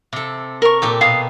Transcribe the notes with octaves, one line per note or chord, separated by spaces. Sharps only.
C3 A4
A#4 C#6
A#2 G4 A4
B2 F5 D#6